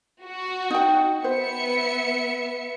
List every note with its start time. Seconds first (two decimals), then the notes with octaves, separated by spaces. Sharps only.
0.25 F#4
0.70 D#4 G5
1.24 B3 C5 E5 C#7